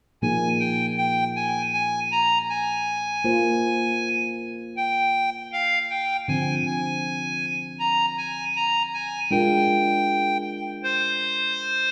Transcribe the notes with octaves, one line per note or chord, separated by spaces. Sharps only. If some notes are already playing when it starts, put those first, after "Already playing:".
A#2 F3 A#3 D#4 G#4 G#5
G5
G5
G#5
G#5
A#5
G#5
A#3 F4 C5
G5
F5
G5
D3 F3 C4 G#5
G#5
A#5
G#5
A#5
G#5
G#3 D4 F4 A#4 G5
C5